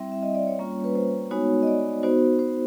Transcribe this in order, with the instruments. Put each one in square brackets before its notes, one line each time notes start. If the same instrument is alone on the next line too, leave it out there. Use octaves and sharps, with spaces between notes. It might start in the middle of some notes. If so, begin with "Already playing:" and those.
Already playing: [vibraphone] G3 C4 E4 E5
E5
D#5
D5
C#5
G3 A#3 C#4 F4
B4
C5
G#3 B3 D#4 F#4 C#5
D#5
D5
B3 D#4 F#4 C5
C5